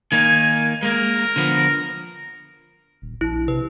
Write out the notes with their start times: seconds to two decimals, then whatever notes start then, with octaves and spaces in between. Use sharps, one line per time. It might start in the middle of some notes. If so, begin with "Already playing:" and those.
0.12 D#3 A#3 D#4 G#5
0.83 G#3 A#3 A#4
1.36 D3 F3 B3
3.02 D#1
3.21 A#1 E4
3.48 C3 B4